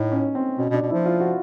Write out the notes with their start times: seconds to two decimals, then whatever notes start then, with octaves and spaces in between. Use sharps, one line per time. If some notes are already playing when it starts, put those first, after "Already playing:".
Already playing: A2 D#4
0.12 C#4
0.35 C4
0.58 B2 C#4
0.70 B2
0.74 D4
0.82 B2
0.90 E4
0.93 F3
1.05 F4
1.20 F#4